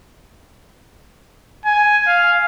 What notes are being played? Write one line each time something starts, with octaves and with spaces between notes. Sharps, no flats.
G#5
F5